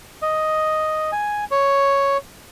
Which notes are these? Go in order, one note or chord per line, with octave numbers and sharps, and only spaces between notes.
D#5
G#5
C#5